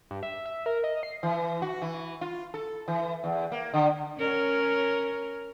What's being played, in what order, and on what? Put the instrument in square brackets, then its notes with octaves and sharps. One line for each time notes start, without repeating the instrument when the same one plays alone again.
[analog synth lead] G2
E5
E5
A#4
D#5
C7
[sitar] E3
F#4
E3
F4
A4
E3
E2
A#3
D3
[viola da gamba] C#4 A#4 C#5